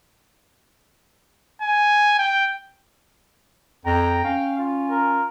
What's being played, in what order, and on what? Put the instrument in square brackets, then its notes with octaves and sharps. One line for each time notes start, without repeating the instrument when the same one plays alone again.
[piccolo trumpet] G#5
G5
[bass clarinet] F2 [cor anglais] G5 [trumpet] A#5
[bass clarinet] C#4 [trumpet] F5
[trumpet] F4
[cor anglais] A#4